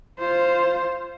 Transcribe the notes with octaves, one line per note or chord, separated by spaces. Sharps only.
F4 C5